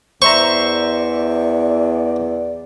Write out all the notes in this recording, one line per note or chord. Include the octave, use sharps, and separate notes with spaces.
E2 C5 D5 E5 A#5 C#6